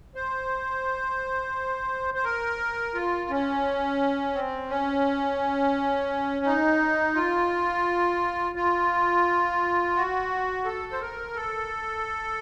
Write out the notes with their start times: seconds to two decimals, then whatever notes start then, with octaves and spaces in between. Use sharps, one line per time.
0.15 C5
2.14 C5
2.24 A#4
2.95 F4
3.30 C#4
4.35 C4
4.69 C#4
6.45 D#4
7.15 F4
8.55 F4
9.96 F#4
10.65 A4
10.92 C5
11.01 A#4
11.36 A4